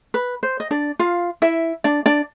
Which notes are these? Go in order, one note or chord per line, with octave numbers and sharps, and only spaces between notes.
B4
C5
D#5
D4 D5
F4 F5
E4 E5
D4 D5
D4 D5